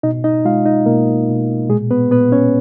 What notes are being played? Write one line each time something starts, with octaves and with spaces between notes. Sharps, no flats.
B2 D#4 D#5
D#4 D#5
G#3 F4 F5
D#4 D#5
B2 A#3 A#4
B2
A#2 G#3 G#4
B3 B4
A#2 B3 B4
C#4 C#5